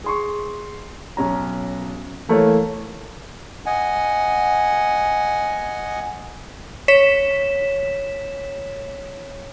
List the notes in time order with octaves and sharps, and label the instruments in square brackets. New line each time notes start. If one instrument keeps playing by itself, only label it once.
[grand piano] G#4 C6 C#6
B1 C#4 A#5
E3 A3 A#3 A4 A#4 C#5
[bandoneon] D#5 F#5 G#5
[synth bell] C#5 B6 E7